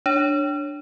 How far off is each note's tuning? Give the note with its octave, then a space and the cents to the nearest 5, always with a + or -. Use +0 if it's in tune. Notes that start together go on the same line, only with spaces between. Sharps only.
D4 +0 C#5 +0